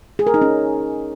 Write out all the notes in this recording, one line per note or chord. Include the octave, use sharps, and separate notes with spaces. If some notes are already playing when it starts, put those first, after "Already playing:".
G#4
A#4
D#4
C#4